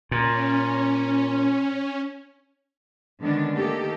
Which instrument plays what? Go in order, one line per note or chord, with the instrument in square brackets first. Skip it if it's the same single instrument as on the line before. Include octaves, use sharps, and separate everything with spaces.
[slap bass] A#2 [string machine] C#4
[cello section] D3 D#3 G#3 B3 C#4 D4
D#3 A3 A#3 G4 A4 D#5